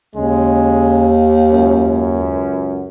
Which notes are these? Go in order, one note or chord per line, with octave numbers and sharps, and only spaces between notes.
D#2 C#3 G#3
C#2 F#2